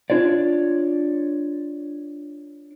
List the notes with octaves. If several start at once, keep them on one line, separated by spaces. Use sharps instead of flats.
D4 F4 C#5 D5